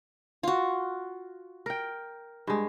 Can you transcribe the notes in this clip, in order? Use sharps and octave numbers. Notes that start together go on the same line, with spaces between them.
F4 F#4
A#4 G5
G2 G#3